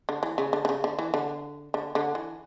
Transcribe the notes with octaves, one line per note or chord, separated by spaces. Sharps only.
D3
E3
C#3
D3
D3
C#3
D3
E3
D3
D3
D3
E3